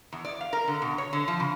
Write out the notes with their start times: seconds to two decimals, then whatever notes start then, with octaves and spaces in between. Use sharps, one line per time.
0.13 E2
0.25 D5
0.41 F5
0.53 A#4
0.68 D3
0.82 B2
0.98 C#5
1.13 D3
1.28 F3
1.40 C#3